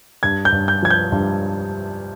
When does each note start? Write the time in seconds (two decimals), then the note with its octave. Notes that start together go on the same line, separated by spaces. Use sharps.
0.23 G2 G#6
0.45 G6
0.52 G2
0.68 G6
0.83 F3 G#6
0.90 G6
1.12 G2